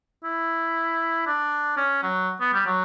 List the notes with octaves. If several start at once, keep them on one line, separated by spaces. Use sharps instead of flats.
E4
D4
C#4
F#3
B3
G3
F#3